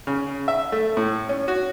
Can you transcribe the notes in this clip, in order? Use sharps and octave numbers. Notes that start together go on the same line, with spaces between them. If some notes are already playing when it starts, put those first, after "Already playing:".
C#3
E5
A3
A2
C#4
F#4